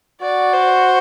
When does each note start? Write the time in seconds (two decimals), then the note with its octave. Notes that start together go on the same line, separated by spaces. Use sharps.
0.21 F#4 D5
0.53 C5